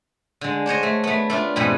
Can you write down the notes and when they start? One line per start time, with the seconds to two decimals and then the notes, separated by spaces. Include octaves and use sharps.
0.41 D3 G#3
0.66 D4 C5 C#5 D#5
0.83 A3
1.04 A3 B3
1.30 A3 D4 F4
1.56 F2 G#2 B2 B3 D#4 G#5